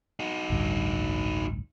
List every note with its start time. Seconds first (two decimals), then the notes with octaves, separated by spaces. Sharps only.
0.20 D#4 F#4
0.50 A1 D2 G2